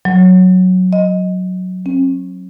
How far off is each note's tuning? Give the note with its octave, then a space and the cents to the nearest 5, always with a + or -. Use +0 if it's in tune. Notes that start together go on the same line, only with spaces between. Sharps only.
F#3 -5
D#5 +10
C#4 -45